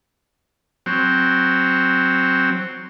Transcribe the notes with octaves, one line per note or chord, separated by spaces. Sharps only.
F#3 C4